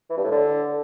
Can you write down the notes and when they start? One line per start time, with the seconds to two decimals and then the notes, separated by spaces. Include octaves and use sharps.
0.10 E3
0.17 G2
0.24 A2
0.31 D3